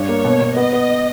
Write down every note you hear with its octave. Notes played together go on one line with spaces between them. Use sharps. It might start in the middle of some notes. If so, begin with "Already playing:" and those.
Already playing: G2 C#5
A#3
B2
B2
B3 D#5
B3